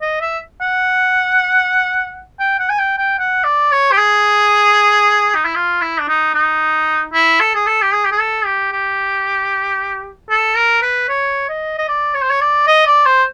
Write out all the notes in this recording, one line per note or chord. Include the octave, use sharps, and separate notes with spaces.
D#5
E5
F#5
G5
F#5
G#5
G5
G5
F#5
D5
C#5
G4
G#4
D#4
E4
F4
E4
D4
D#4
D#4
E4
A4
G#4
A4
G4
G#4
G4
G#4
A4
G4
G4
A4
A#4
B4
C#5
D#5
D#5
D5
C#5
C5
C#5
D5
D#5
D5
C5